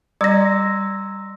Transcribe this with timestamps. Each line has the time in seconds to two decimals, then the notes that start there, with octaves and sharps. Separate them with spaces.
0.21 G3 D5 A#5 C6 E6 G#6 A#6